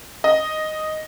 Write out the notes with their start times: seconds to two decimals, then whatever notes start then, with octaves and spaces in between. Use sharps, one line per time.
0.24 D#5